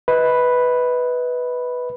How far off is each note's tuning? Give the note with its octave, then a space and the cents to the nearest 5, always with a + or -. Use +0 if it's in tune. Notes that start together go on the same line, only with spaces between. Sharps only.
B4 +0 D#5 +35 B5 +0